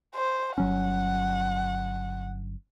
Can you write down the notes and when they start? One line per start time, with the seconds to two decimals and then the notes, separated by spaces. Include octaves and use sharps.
0.15 C5
0.58 G1 F#3 C#4 F#5